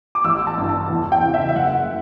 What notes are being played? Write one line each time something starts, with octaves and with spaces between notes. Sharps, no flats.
D6
A1 E6
A5
G2 E3
A5
E2
G5
C#3 E3
E5
E5
F#1 F#5